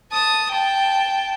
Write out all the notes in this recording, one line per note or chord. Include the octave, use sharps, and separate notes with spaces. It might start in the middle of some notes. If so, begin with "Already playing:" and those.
A5 D#6
G5 A5